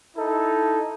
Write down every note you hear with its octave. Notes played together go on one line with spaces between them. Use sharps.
D#4 E4 A4